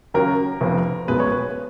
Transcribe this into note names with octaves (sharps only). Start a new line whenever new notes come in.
D#2 C#3 F#3 A#4
F1 F2 F3 B3
B1 B2 G#3 B3 B4
C#5
B4